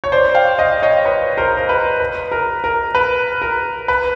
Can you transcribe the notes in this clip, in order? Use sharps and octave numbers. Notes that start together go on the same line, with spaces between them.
C#5
C5 D5
F5 G5
D#5 F5
C#5 D#5
B4 C#5
A#4 C5
A#4
B4
B4
A#4
A#4
B4
A#4
B4